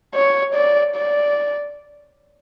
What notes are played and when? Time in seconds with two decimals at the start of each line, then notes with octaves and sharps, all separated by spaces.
0.14 C#5
0.55 D5
0.95 D5